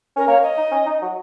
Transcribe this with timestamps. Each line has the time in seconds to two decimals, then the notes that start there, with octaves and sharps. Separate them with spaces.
0.16 C#4 A#4
0.28 A#3 C#5
0.43 D#5
0.57 D#4
0.72 C#4
0.86 D#4
1.02 F#3